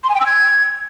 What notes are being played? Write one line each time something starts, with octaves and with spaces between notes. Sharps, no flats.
C6
G#5
G5
E6
G#6